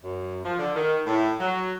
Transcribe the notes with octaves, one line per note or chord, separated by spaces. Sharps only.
F#2
F3
D3
D#3
A2
F#3